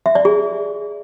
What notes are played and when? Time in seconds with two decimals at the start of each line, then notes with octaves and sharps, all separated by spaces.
0.06 E5
0.15 D5
0.25 G#4